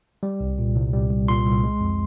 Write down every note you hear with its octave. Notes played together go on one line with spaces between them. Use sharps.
G3
C2
A#2
C2
G3
C2
A#2 C6
C2
G#3
F2